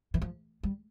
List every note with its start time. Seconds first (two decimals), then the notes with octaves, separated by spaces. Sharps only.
0.14 E3
0.22 F3
0.63 G3